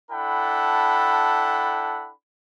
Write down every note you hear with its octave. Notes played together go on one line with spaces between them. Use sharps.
D4 E4 A4 F#5 G5 B5